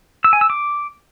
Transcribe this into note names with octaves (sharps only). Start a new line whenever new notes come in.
E6
G#5
E6
D6